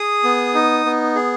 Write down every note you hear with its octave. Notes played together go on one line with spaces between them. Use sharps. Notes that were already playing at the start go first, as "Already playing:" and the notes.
Already playing: G#4 D#6
B3
D#4
B3
G#4